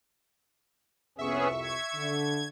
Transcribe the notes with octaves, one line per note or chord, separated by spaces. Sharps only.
C2 F2 C3 B3 C#4 G#4 E5 C#6
G#6
D3